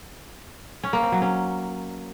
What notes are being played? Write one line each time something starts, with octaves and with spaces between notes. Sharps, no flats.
C#4
A#3
C4
F#3
C#4